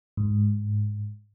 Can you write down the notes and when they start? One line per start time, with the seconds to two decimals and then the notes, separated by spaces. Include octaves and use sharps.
0.17 G#2